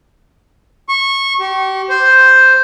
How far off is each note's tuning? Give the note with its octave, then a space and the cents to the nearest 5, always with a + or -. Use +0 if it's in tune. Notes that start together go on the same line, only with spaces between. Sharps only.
C#6 -20
G4 -40
C5 +0